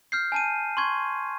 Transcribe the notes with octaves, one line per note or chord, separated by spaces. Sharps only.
F6 G6 C7
G#5 A5 D#7
C6 C#6 G#6